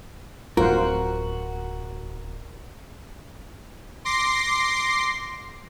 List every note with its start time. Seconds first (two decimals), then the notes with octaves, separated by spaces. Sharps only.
0.57 D1 F4 F#4 A#4 C5 F#5
4.05 C6 D6 A#6 C7